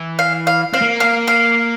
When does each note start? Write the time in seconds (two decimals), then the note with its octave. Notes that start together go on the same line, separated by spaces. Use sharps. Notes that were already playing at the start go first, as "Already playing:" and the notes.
Already playing: E3
0.19 F5
0.47 F5
0.73 C4 F5
0.82 A#3
1.00 F5
1.28 F5